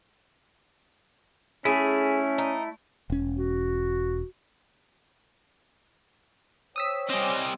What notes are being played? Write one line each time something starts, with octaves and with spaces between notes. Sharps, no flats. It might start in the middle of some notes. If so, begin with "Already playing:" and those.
A3 C#4 E4 G#4
D#4
E1 C#4
F#4
C5 C#5 G5 D#6 E6 B6
G3 C4 D#5 G#5 D6